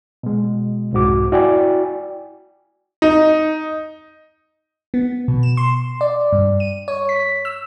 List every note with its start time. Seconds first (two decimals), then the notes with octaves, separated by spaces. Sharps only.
0.23 B2 G#3
0.93 C2 F2 G#2 F#4 D6
1.32 E4 F#4 D5 G5 G#5
3.02 D#4
4.94 B3
5.28 B2
5.43 E7
5.57 C6
6.01 D5
6.33 G2
6.60 D#7
6.88 C#5
7.09 B6
7.45 E6